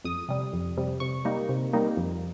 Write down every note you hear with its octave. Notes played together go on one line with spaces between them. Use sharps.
F2 D#6
C3 G3
F2
C3 G3
C3 C#6
G3 A#3 D#4
C3
G3 A#3 D#4
F2